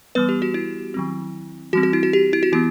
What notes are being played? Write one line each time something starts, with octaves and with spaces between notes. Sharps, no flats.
E3 G3 B3 B4
G4
F#4
E4
D#3 F#3 C4
E3 G3 C4 F#4
F#4
E4
F#4
G4
E4
F#4
E3 B3 E4